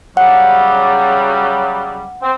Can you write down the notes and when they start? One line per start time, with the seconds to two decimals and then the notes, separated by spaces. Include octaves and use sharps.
0.17 C#3 F#3 G3 F#5
2.22 C4